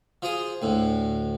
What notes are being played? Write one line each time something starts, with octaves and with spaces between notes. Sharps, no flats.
F3 G#4
D2 A2